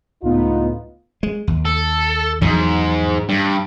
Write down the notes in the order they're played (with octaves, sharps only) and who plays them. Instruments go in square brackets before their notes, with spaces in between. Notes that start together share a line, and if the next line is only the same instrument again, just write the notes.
[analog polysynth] C#2 A2 B3 [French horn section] D#4 F4
[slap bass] G#3
D#2
[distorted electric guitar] A4
[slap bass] E2 F3 F#3 [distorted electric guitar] G#2
[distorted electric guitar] G2